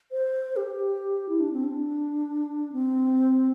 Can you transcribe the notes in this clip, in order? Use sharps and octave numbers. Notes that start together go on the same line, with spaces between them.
C5
G4
E4
D4
C4
D4
C4